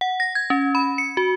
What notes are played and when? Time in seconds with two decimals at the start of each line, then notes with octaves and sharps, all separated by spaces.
0.01 F#5
0.20 A#6
0.35 G#6
0.50 C#4
0.75 B5
0.98 C#7
1.17 F#4